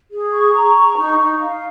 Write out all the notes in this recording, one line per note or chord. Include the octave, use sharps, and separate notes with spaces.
G#4
C#6
A#5
C#6
D#4
D#4
F5